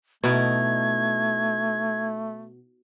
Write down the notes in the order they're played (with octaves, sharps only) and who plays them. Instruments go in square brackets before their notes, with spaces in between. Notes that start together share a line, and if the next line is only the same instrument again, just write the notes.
[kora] B2 D#4 E4 [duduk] A3 [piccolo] G#6